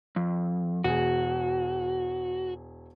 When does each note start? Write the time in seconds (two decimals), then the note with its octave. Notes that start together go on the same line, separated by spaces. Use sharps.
0.16 F2
0.84 E1 F#4 G#4